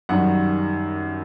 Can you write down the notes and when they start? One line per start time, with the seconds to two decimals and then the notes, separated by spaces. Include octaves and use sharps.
0.09 F#2 D#3 G3 F#5